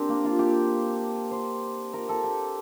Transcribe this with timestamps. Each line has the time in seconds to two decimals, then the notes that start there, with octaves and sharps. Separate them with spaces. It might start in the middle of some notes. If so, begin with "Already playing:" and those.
Already playing: C4 D4 G4 A#4
0.09 A#3
0.25 F4
0.39 G4
1.31 C5
1.93 A#4
2.09 A4
2.24 G4